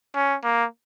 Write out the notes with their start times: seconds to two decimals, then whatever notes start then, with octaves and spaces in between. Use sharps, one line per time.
0.15 C#4
0.44 A#3